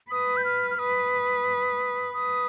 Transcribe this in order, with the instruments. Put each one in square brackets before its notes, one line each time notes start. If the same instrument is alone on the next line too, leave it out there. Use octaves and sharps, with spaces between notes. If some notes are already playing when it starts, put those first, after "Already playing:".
[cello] B4 [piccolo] D#6
[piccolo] G6
F6
F6
[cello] B4 [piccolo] D#6
[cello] B4 [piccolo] D#6